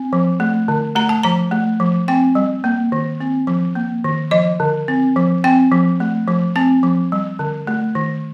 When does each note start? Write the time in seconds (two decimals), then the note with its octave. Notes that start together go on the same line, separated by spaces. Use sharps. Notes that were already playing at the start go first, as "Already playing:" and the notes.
Already playing: C4
0.13 F3
0.40 A3
0.68 D3
0.95 A3 A#5
1.09 A5
1.23 F3 A#5
1.51 A3
1.80 F3
2.08 C4 G5
2.35 G3
2.64 A#3
2.92 D#3
3.20 C4
3.47 F3
3.75 A#3
4.04 D#3
4.31 F3 D#5
4.60 D3
4.88 C4
5.16 F3
5.44 C4 G5
5.72 F3
6.00 A3
6.28 F3
6.56 C4 A5
6.83 F3
7.12 G3
7.39 D3
7.67 A3
7.95 D#3